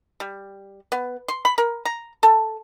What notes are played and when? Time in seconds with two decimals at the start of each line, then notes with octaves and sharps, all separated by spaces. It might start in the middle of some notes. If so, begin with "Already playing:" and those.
0.20 G3
0.92 B3
1.28 C6
1.45 B5
1.58 A#4
1.85 A#5
2.23 A4